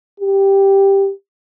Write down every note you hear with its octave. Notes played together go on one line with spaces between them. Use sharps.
G4